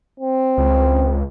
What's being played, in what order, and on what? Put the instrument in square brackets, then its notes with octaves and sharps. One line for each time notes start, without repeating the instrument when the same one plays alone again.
[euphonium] C4
[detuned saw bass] C#2